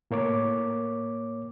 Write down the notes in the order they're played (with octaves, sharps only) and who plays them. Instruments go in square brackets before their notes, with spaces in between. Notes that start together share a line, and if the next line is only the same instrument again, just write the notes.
[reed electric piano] A2 A#3 C#5 D6